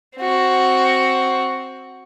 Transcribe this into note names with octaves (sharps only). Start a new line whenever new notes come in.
C4 F#4